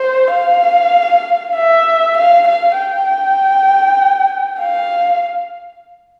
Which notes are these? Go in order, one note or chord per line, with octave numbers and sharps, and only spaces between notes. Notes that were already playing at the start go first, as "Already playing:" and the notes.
Already playing: C5
F5
E5
F5
F5
G5
F5